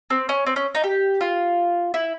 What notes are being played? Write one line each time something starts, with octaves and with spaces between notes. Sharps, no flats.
C4
C#4
C4
C#4
D#4
G4
F4
E4